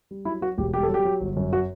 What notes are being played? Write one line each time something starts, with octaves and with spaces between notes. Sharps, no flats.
G3
F#3 E4
F#3 F#4
E1 G4
G3 G4
A4
F#3
G4
F#3
G1
F#2
F#4